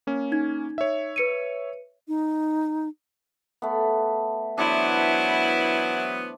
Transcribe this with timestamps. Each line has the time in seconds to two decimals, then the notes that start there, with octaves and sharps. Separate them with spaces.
0.07 A#3 C#4
0.32 D#4 G#6
0.78 C#5 E5
1.16 B4 C#7 D#7
2.08 D#4
3.62 A3 B3
4.58 E3 F#3 B3 D4 E4 C5